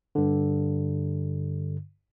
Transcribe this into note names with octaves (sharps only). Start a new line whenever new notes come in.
G2 D3